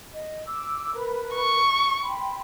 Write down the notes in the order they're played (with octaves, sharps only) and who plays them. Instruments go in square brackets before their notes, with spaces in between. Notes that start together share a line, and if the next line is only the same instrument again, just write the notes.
[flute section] D#5
D6 E6
A#4 B4
[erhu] C#6
[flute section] G5 B5 C6